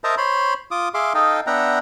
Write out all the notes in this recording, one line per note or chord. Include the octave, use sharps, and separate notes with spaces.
A#4 C5 D#5 E5 A5 A#5
C5 C#5 B5 C6
F4 D6 D#6
G#4 E5 F5 C6 D6
D#4 A4 D#5 F5 G5
B3 D4 E5 F#5 G5 A#5